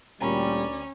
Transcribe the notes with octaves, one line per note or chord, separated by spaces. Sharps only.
D2 A#2 G3 C#4 D5 G5 A#5 B5